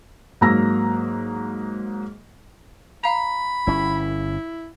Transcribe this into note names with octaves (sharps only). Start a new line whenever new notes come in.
G#2 F#3 A#3 A#5 E6 A#6
F5 A#5 B5
G1 C#4 E4